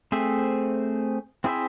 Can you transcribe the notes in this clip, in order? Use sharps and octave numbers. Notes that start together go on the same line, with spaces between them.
A3 C4 G#4 C5 E5
C4 E4 G#4 C5 E5